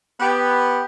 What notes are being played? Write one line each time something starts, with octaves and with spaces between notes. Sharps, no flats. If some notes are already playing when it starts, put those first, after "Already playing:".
B3 G4